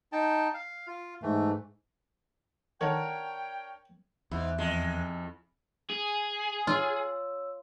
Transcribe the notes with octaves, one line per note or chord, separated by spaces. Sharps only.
D#4 G5 A5
F5
F4
G#2 E3 A3
D3 D#3 D4 A#4 C#5 F#5 G5 A5
E2 G#2 E4
F2 G#3
G#4
F4 C#5 E6